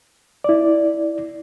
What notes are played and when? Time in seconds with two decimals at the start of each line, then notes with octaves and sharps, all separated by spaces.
0.44 E4 D5